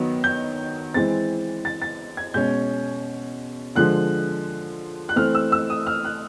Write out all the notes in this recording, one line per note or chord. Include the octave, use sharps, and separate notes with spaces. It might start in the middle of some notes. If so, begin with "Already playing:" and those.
Already playing: D#3 F#3 B3
G6
E3 G#3 C4 A6
A6
A6
G#6
B2 G#3 C#4 G6
D3 F3 G#3 F#6
F#6
E3 A3 C4 F6
E6
E6
D#6
F6
F#6